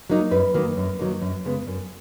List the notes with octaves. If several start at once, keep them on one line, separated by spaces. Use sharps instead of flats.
F#3 A#3 D#4
F#2 B4
D#3 F#3 A#3 D#4
F#2
D#3 F#3 A#3 D#4
F#2
C#3 G#3 B3
F#2